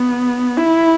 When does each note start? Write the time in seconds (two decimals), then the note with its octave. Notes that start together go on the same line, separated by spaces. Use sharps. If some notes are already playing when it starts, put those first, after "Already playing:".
Already playing: B3
0.57 E4